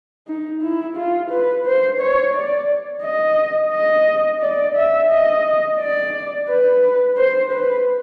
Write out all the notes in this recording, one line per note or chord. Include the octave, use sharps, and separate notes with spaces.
D#4
E4
F4
B4
C5
C#5
D5
D#5
D#5
D5
E5
D#5
D5
B4
C5
B4